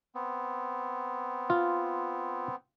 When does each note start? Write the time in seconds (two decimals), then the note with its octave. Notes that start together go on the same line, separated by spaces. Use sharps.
0.15 B3 C4
1.50 F4